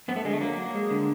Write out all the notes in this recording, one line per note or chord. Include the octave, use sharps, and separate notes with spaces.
F#2 B3
A3
D3 G#3
A3
F#3 A#3
F#3
G#3
D3